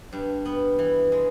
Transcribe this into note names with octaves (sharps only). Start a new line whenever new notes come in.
G2
B3
E3
G#3